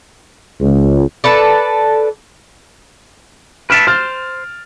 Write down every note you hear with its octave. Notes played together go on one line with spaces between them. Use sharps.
C#2
A4 B4 D5
B4 E5 A5 F6 D7 E7
C5 F6 A6